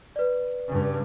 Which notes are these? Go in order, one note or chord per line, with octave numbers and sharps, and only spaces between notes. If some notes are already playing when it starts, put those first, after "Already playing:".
B4 D5
G2 C#3